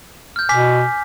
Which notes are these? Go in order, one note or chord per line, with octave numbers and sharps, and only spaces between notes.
F6 G6
B2 G#5 D6 B6